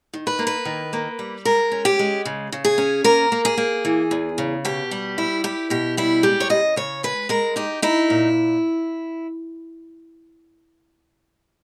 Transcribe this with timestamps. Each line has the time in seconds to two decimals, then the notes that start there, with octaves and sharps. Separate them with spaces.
0.13 D#3
0.27 B4
0.39 A#3
0.47 B4
0.65 D#3
0.93 A#3
1.19 G3
1.45 G#3 A#4
1.72 C#4
1.85 G4
1.99 G#3
2.25 C#3
2.52 C#3
2.65 G#4
2.78 C#4
3.04 A#3 A#4
3.32 A#3
3.45 G#4
3.57 A#3
3.85 E3
4.11 E2
4.38 C#3
4.65 B2 G4
4.91 G3
5.18 E4
5.44 E4 G4
5.70 B2 G4
5.97 G3 E4
6.23 G#3 G4
6.40 C#5
6.49 C#3 D#5
6.76 C#3 C#5
7.03 G#3 B4
7.29 G#3 A#4
7.56 D#4 G4
7.82 D#4 E4
8.10 A#2